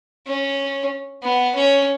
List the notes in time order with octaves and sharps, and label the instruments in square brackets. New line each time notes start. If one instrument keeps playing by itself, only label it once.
[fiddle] C#4
B3
C#4